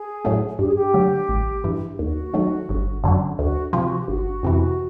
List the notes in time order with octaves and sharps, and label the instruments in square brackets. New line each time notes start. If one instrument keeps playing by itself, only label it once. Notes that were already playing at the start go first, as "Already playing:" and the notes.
Already playing: [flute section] G#4
[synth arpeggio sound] A2 F#3 A3
[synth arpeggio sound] G2 [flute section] G4
[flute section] G#4
G4
[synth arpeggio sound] D3 F#3 A3
A1
G2 E3
[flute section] G4
[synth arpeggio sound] D#2 [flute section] F#4
[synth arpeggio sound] D#3 F#3 A3
G1
F#2 D3 F#3
[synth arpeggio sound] D2 [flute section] F#4
[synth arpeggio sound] C3 F3 [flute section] F#4
[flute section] G4
[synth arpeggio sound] G1 [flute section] F#4
[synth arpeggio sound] F2 C3 E3